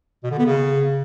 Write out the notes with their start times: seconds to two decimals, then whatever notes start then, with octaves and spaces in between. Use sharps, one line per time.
0.24 B2
0.31 D3
0.39 B3
0.46 C#3